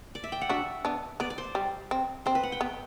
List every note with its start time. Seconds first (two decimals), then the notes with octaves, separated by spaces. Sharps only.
0.15 D5
0.24 E5
0.32 G5
0.41 F#5
0.49 D4 F#4 E5
0.85 B3 D4
1.20 B3 D5
1.30 D5
1.38 C5
1.55 G3
1.91 C4
2.26 C4 C5
2.35 B4
2.43 F#5
2.52 G5
2.61 B3